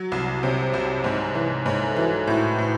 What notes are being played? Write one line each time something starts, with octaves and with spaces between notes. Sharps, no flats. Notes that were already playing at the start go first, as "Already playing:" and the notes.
Already playing: F#3 F#4
C2
C3 C#5
C5
C2
C#5
G#2 D#5
E3 C#5
G#2 C#5
A4
E3 F#4
A2 F#4
A2